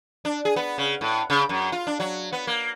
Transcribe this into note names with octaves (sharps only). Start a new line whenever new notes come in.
D4
G#4
B3
C#3
A2
C#3
F#2
F4
D4
F#3
B3
A#3